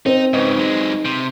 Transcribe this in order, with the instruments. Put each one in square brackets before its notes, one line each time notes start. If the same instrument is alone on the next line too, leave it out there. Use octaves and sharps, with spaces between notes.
[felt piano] C4 [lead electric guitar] D#4
[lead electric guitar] G#2 C#3 [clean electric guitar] D#4 B4 D#5
[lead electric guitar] F#3 G#3
C3